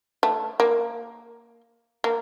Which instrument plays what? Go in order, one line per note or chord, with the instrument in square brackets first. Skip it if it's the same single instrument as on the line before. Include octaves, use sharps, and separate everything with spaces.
[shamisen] A3
A#3
A#3